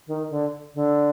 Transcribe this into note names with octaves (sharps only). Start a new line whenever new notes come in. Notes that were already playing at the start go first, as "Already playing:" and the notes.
D#3
D3
D3